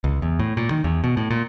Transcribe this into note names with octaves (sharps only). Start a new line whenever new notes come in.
C#2
E2
A2
A#2
D#3
E2
B2
A2
A#2